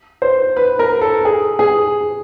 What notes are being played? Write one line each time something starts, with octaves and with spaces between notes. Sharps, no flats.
C5
B4
A#4
A4
G#4
G#4